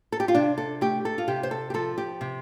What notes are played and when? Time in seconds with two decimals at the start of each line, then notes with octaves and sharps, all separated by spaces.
0.12 A4
0.20 G4
0.28 F4
0.34 C3 D4
0.58 A4
0.81 A3 G4
1.05 A4
1.18 F4
1.28 C3 G4
1.43 C5
1.51 A4
1.70 G4
1.74 F3 A4
1.98 G4
2.21 C3